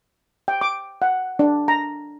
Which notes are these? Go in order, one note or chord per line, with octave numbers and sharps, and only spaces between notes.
G5
D6
F#5
D4
A#5